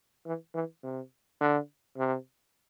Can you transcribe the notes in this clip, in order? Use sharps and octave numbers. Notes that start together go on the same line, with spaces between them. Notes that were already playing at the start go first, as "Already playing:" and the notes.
E3
E3
C3
D3
C3